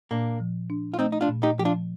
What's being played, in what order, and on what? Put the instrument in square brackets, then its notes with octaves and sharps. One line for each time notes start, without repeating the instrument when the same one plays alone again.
[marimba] A#2 [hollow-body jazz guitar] A#3 D4
[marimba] F3
D4
[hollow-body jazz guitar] F4
[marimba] A3 [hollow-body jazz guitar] C4 D#4
[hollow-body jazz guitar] D#4
D4 F4
[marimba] A#2
[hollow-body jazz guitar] D#4 G4
[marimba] F3 [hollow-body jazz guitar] G4
[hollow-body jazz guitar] D4 F4